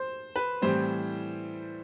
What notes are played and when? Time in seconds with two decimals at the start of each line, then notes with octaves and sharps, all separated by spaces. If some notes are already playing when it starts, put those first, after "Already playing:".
Already playing: C5
0.36 B4
0.62 A2 E3 G3 C4 C5